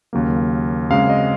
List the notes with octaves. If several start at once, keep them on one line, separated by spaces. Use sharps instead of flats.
D#2 C#3 F#3 A#3
F#2 C#3 G#3 C4 F5
D#5